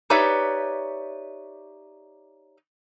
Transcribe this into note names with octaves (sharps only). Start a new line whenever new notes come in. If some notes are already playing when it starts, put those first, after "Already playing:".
D#4 G4 B4 C#5 D5 E5